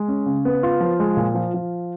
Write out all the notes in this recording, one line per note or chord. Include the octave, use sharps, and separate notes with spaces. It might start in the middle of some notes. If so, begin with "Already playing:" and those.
Already playing: G#3
C#4
C#3
B3
F4
F3
G#3
A#2
F3
F3